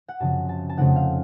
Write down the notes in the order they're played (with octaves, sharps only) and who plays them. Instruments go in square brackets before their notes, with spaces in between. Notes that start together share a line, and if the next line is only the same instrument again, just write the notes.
[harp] F#5
F#2 C#3 F3 C4 A5
A5
A5
F2 C#3 A3 C4 D#4 F#5
F5